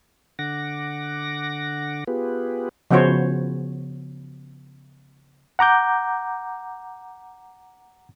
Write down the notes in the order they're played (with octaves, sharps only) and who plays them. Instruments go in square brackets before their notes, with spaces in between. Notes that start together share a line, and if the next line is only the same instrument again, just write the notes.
[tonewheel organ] D3 F#5 D6 A#6
B3 F4 G4 G#4 B4
[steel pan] C#3 F3 B3 F#4 C5 C#5
[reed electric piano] F#5 A#5 D6 G6